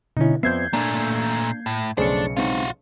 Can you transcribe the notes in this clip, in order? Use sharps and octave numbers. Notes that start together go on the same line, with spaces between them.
B2 D3 C#4 D#4 E4
F2 B3 C5 D5 E5 G6 G#6 C7
A#2 A3 A#3 D4
A2
B1 F2 C#3 A3 D4 G#4 C5 C#7
G#3 C4 D#4 F4 F#4